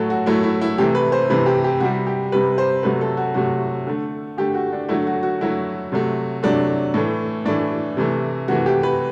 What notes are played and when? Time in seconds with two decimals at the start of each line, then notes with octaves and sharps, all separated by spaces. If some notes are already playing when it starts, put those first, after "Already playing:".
Already playing: A2 F#3 A3 A4
0.10 F#4
0.26 A2 F#3 A3 E4
0.43 E4
0.61 E4
0.78 C3 E3 A3 G4
0.95 B4
1.12 C5
1.29 C3 E3 A3 B4
1.46 G4
1.64 G4
1.80 C3 G3 F#4
2.07 G4
2.32 C3 G3 B4
2.58 C5
2.83 C3 F#3 A3 B4
3.01 A4
3.17 F#4
3.34 C3 F#3 A3 F#4
3.87 D3 A3
4.38 D3 A3 G4
4.54 F#4
4.73 D4
4.89 D3 F#3 A3 E4
5.07 F#4
5.23 F#4
5.41 D3 F#3 A3 E4
5.92 C3 F#3 A3
6.43 C3 F#3 A3 D4
6.94 A2 E3 A3
7.45 A2 E3 A3 D4
7.97 C3 E3 A3
8.48 C3 E3 A3 F#4
8.66 G4
8.83 B4